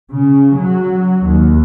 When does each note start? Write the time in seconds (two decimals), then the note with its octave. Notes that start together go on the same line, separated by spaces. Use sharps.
0.11 C#3
0.56 F#3
1.24 D#2